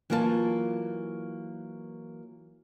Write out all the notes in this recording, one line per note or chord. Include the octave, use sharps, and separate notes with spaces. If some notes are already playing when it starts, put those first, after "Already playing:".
E3 F#3 A#3 F4 C#5 A5